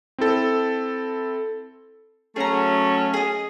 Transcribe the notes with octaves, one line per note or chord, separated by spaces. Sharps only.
C4 E4 A4
F#3 A3 C#4 G#4 A#5
G#4 D#5